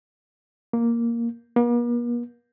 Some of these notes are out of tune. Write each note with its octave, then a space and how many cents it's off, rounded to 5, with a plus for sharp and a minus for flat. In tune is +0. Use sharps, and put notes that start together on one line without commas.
A#3 +0
A#3 +45